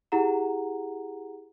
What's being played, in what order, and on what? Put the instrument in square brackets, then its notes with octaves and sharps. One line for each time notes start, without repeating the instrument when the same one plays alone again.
[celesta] E4 G4 G#4 F#5 A#5